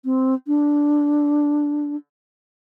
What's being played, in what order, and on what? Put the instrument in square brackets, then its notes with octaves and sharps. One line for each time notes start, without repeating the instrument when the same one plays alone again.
[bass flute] C4
D4